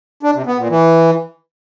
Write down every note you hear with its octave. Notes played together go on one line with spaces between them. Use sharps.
D4
C3
B3
A#2
E3